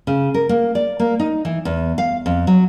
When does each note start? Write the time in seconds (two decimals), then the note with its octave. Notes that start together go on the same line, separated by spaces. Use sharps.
0.07 C#3
0.34 A#4
0.49 A#3
0.75 D5
1.00 A#3
1.19 D#4
1.45 E3
1.65 E2
1.98 F5
2.26 F2
2.47 F#3